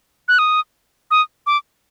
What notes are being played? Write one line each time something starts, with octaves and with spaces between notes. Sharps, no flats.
F#6
D#6
D#6
D6